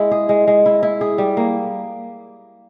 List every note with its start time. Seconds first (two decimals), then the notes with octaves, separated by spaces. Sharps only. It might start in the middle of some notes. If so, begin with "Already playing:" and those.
Already playing: G#3 E4
0.11 G#4
0.29 G#3
0.47 G#3
0.66 E4
0.83 E4
1.01 G#4
1.18 G3
1.37 A#3